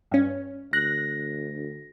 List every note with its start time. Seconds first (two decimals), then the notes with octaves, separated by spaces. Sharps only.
0.11 G2 C#4
0.73 D2 F#6 A#6